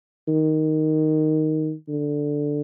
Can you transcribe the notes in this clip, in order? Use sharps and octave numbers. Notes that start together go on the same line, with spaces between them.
D#3
D3